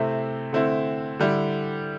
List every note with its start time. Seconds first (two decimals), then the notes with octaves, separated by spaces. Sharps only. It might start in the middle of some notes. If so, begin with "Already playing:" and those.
Already playing: C3 A3 C4 E4
0.53 D3 A3 C4 E4
1.20 D3 G3 E4